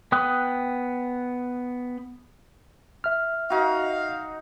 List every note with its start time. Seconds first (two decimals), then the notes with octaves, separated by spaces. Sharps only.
0.12 B3 G5 D#6 F#6
3.04 E5 F6
3.50 D#4 F#4 F5